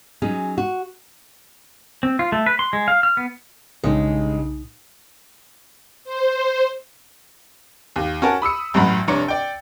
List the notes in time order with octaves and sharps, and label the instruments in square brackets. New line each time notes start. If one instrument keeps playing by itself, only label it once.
[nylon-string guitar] F#3 C#4 D#4 G#4
F#4
[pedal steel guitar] C4
F4
A3
B4
C6
G#3
F5
F6
B3
[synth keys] B1 A#2 D#4 [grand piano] G2 C#3 [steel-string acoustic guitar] G#3
[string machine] C5
[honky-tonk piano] D#2
C#4 F#4 A#4 A5
B5 D#6 E6 C#7
A1 F#2 A2 F#5 A#5 B5
F1 D4 C#5 A#5 C#7
D5 G5